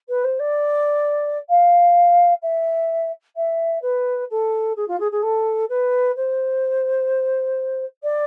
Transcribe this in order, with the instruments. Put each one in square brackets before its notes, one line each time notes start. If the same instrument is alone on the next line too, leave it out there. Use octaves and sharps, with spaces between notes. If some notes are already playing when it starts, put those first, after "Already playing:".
[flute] B4
C5
D5
F5
E5
E5
B4
A4
G#4
F4
G#4
G#4
A4
B4
C5
D5